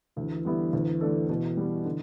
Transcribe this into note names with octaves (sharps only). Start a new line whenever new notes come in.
D2 E3
D3 G3 B3 E4
D2
D3 A3 D4 A4
B2
G3 B3
D3